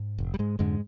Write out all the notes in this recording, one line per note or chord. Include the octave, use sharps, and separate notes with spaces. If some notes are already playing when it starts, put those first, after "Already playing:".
Already playing: G#2
F1
G3
G#2 G#3
F2 G#2 D3 G#3